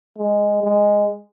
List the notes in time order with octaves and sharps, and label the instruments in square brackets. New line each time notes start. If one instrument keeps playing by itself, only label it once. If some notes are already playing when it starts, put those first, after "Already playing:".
[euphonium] G#3
G#3